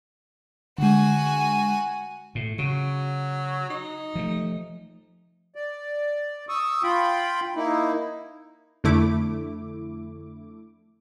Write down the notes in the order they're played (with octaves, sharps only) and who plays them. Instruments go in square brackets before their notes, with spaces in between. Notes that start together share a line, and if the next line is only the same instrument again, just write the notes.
[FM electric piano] D3 G#3 [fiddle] F#4 G#5
[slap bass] A2
[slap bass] C#3 [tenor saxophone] F#3
[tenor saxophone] D#4
[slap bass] F3 A3
[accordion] D5
C#6 D#6 E6
F4 G5 B5
A#3 D#4 E4
[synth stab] F2 D3 A3 E4 D6